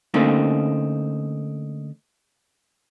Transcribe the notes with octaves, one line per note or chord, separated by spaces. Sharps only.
D3 A3 A#3 C4 C#4 D#4